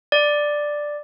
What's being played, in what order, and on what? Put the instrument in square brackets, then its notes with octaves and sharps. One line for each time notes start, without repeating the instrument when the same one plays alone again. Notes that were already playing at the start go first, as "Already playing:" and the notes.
[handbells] D5